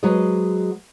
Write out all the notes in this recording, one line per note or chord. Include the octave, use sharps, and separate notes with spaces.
F#3 G#3 B4 C5 D#5